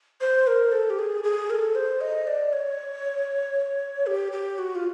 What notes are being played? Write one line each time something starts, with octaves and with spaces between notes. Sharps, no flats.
C5
A#4
A4
G4
G#4
G#4
A#4
A4
C5
D#5
D5
C#5
G4
G4
F#4
F4